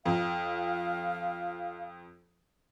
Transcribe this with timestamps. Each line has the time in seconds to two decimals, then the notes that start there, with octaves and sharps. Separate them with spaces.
0.06 F2 F5